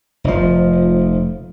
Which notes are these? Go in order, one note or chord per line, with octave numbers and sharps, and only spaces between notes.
F1 F3